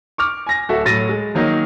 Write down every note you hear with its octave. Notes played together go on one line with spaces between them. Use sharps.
C#6 D6 F6
G#5 A#6
D1 F#4 A4 E5
A2 F#3 A6 A#6 D#7
G#3
D#3 F#3 A#3 D#4